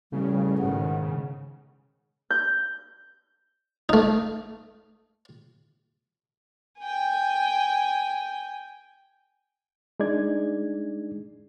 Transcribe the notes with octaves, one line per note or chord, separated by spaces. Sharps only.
A1 C#3 G3
G#2 B2 D#3 F#5
G6
A3 D#4
G5 G#5
G#3 D4 D#4 G#4 D5 G#6